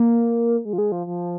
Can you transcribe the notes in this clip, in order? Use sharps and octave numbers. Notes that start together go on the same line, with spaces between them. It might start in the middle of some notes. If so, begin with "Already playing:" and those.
Already playing: A#3
G#3
F3
G#3
F3
F3